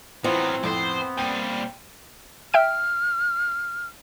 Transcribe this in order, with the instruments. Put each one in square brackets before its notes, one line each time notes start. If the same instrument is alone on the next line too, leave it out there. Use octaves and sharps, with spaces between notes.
[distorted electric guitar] A2 F#3 [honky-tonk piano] E3 F4 [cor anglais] B3 [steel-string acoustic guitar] C4
[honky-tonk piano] F2 A2 [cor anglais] B3 [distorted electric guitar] C5 D5
[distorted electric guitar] A#2 G3 [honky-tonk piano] G5 D#7
[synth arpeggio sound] E5 G5 D7 [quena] F6